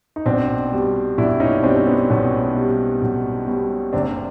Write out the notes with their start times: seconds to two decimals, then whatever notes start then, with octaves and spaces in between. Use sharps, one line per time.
0.16 D#4
0.26 B1 C4 D4
0.72 B2 G3
1.18 B1 D4 E4
1.40 C#4 D#4
1.63 B2 G3 C4 D4
1.86 B3 C#4
2.10 B1 B3 C#4
2.55 B2 G3
3.02 B1
3.47 B2 G3
3.93 F#1 C4 D4